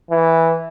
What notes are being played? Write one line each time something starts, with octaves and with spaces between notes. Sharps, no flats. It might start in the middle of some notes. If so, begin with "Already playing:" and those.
E3